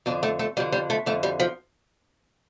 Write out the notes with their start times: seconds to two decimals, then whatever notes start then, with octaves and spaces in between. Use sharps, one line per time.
0.06 F2 D3 D4
0.23 A3
0.39 A3
0.57 F2 G3
0.60 D3
0.72 G3
0.90 A3
1.06 F2 D3 A3
1.23 G3
1.40 F3